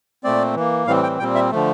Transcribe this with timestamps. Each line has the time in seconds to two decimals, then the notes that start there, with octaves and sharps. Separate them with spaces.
0.24 A#2 A3 C4 D5
0.56 E3 A#3
0.87 A2 E3 G3 C4 F5
1.03 G5
1.19 A#2 G3 C4 G5
1.35 E5
1.51 D3 F3 A3